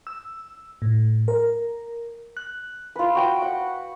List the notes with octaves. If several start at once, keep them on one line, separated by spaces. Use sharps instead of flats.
E6
A2
A#4
F#6
F4 B4
F#4 G5
F#5